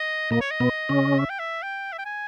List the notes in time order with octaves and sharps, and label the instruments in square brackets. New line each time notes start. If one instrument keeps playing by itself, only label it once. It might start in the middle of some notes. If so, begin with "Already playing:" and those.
Already playing: [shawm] D#5
[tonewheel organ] A#2 A#3 [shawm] D#5
[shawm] C#5
D#5
[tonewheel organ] B2 B3
C#3 C#4
[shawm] E5
G5
E5
G5
E5
G5
G#5